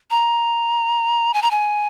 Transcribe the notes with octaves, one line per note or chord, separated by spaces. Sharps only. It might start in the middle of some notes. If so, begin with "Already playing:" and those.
A#5
G#5
A#5
G#5